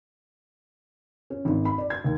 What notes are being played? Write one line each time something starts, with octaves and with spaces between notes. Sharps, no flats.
C#4
G#1
B5
D5
G#6
D#2